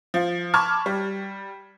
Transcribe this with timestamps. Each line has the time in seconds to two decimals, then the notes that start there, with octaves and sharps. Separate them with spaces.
0.14 F3
0.54 A5 B5 C#6 D6 F6 G#6
0.86 G3